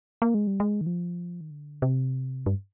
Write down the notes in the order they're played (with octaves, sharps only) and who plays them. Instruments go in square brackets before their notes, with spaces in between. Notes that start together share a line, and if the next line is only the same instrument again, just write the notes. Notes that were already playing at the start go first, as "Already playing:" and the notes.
[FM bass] A#3
G#3
G3
G#3
D#3
F3
D#3
D3
C3
G2